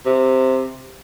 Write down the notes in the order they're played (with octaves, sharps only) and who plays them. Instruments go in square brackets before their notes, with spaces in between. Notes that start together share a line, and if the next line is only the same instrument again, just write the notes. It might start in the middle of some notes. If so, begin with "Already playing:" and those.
[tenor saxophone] C3